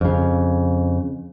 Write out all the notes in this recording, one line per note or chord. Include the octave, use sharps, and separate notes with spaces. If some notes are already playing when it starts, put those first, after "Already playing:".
F2 C#3